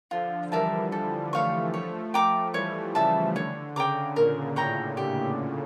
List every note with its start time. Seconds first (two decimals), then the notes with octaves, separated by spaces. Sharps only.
0.11 D3 F3 F4
0.52 E3 G3 A#4 E5 A5
0.92 E3 G3 A4
1.33 F3 A3 C#5 F5 C#6
1.73 F3 A3 C#5
2.14 G5 A#5 D6
2.54 E3 G3 C#5
2.95 C#3 E3 E5 A5
3.35 D3 C#5
3.75 C#3 G5 A#5 D6
4.16 A#2 A#4
4.56 A2 C#5 G5 A#5
4.97 G4